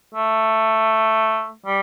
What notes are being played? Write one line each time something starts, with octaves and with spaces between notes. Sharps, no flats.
A3
G3